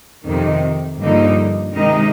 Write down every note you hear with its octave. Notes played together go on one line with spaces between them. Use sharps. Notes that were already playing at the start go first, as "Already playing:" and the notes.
F2 C3 D#3
G2 D3 F3 A#3 D#4
C3 D#3 G#3 D#4